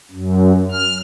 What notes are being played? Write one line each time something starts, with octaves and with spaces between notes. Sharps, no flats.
F#2
F6